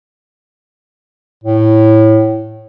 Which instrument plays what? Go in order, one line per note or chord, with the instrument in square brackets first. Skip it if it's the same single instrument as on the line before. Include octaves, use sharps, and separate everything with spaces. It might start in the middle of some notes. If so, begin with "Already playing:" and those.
[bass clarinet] A2